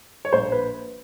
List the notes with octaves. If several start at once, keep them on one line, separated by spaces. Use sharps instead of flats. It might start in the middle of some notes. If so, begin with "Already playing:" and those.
C#5
A#1 C5
B4